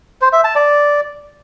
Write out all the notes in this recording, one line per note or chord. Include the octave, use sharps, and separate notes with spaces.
C5
E5
A5
D5